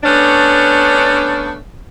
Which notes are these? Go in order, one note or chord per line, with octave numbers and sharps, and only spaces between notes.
A3 B3 C#4 D4